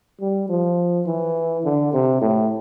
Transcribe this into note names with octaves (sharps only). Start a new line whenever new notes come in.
G3
F3
E3
D3
C3
A2